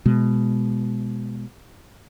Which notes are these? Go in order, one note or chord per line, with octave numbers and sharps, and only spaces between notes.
B2 G#3